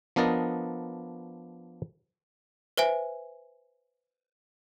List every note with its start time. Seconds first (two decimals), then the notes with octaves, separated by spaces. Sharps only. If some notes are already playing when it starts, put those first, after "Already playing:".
0.16 F3 B3 D4 A#4 D5 D#5
2.77 B4 C5 E5 G#5